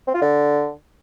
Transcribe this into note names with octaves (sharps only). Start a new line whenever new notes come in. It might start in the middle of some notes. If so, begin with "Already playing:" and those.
C4
F4
D3